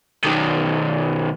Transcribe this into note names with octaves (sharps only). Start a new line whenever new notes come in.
B1 D#3